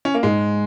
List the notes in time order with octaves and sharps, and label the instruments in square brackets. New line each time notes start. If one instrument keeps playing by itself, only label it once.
[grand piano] C#4
A#3
[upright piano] G#2 [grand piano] G#3